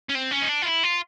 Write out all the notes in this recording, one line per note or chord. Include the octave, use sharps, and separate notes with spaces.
C#4
C4
C#4
D#4
D4
F4
E4
F4